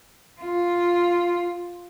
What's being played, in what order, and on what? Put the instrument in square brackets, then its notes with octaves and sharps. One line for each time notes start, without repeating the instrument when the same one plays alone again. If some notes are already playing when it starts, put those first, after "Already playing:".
[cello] F4